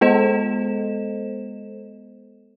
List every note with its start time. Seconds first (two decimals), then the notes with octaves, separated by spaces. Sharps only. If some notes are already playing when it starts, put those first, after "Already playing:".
0.01 G#3 B3 A4 C5 D#5 E7